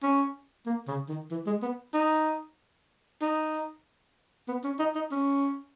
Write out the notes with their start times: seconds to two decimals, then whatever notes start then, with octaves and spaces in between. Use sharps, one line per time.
0.03 C#4
0.66 A#3
0.88 C#3
1.09 D#3
1.31 E3
1.47 G#3
1.62 B3
1.94 D#4
3.22 D#4
4.48 B3
4.64 C#4
4.79 D#4
4.95 D#4
5.12 C#4